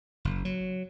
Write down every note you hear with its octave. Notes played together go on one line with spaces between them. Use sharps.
F#1
F#3